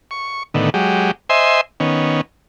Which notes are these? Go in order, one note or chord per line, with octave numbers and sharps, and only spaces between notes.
C#6
A2 D3 D#3 B3
F#3 G#3 G4
C5 D#5 E5 G#5 C6
D#3 B3 C#4